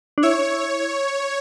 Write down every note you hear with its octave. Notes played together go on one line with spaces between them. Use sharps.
D4
E4 C#5